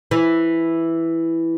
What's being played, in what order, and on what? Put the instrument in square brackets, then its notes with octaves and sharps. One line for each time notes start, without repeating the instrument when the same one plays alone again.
[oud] E3